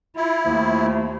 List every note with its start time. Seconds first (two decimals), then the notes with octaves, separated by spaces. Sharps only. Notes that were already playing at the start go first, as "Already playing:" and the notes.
0.16 E4 F4
0.46 D#2 F3 A3 A#3